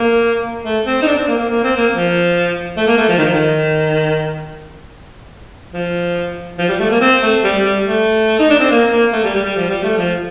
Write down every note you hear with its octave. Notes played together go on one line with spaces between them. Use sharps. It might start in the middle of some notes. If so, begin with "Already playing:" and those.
Already playing: A#3
A3
C4
D#4
D4
C4
A#3
A#3
A#3
C4
A#3
F3
A3
A#3
A3
F3
D#3
F3
D#3
F3
F3
G3
A3
A#3
C4
A3
G3
G3
A3
D#4
D4
C4
A#3
A#3
A3
G3
G3
G3
F3
G3
A3
F3